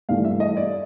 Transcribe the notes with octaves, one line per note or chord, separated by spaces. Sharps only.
G2 E3 A3 F5
E5
D#5
D5